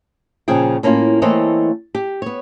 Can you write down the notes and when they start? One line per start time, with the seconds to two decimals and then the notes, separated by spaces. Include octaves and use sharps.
0.48 A#2 C#3 F3 G#4 G5
0.83 A2 A#3 C#4 D#4 F4
1.22 E3 A3 A#3 C4 C#5 D#5
1.95 G4
2.22 B3 C#5